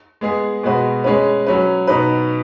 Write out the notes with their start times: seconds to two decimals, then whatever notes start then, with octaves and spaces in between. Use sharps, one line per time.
0.21 G#3 B3 G#4
0.63 B2 G#3 B3 F#4 B4
1.04 G#3 C#4 B4
1.47 F#3 C#4 B4
1.87 B2 B3 D#4 B4